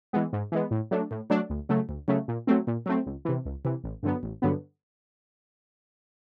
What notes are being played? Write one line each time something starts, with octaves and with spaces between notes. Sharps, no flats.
E3 G#3 B3
G#2
E3 G#3 B3
A2
F#3 A3 D4
A2
F#3 A3 D4
D2
C#3 F#3 A3
D2
C#3 F#3 A3
A#2
F#3 A3 C4
A#2
F#3 A3 C4
C#2
C3 E3
C#2
C3 E3
A1
G2 D3 F#3 B3
A1
G2 D3 F#3 B3